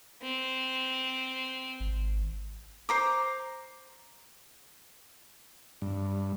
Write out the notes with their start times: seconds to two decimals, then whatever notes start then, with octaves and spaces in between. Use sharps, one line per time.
0.22 C4
1.80 G#1
2.89 C5 A#5 D6
5.82 G2